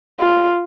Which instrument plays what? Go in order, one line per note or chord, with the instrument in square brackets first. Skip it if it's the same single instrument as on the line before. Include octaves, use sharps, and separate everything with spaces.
[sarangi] F4